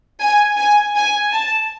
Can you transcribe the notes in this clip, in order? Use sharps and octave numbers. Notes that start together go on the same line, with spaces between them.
G#5
G#5
G#5
A5